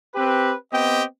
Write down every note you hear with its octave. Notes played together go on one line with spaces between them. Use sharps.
C4 G4 B4
B3 C4 G4 D#5 G5